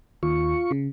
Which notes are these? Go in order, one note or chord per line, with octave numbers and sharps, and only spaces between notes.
D#2 F4 C#6
C#3